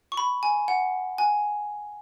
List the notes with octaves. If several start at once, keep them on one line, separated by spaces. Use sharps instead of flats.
C#6
B5
G#5
F#5
G#5